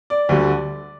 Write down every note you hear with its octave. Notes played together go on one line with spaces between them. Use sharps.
D5
D2 D3 G3